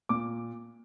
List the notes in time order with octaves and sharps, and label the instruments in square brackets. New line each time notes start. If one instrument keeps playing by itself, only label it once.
[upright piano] A#2 D6